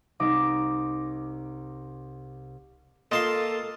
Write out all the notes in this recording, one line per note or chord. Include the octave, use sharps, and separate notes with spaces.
C2 D#4 D6 A#6
A#3 F4 A4 D#5 A5 C6